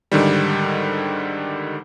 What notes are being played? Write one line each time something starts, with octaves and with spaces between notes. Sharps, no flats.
G#2 D3 D#3 G3